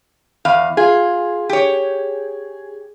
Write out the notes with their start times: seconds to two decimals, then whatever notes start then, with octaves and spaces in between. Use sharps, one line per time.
0.45 E2 F5
0.77 F4 G#4
1.49 G4 C#5